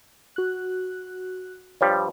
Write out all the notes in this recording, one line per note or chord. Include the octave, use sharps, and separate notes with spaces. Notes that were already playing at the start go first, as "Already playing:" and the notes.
F#4 F#6
G2 F3 G3 C#5